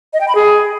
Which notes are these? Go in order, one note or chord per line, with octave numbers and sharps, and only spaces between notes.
D#5
G5
B5
G#4